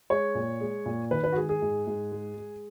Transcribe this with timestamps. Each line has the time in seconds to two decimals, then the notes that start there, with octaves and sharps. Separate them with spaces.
0.10 G#3 C#5
0.35 A#2
0.61 G#3
0.86 A#2
1.11 D#3 B4
1.24 B4
1.32 F#4
1.36 G#3 G#4
1.49 G#4
1.62 G#2
1.87 G#2
2.12 G#3
2.37 G#3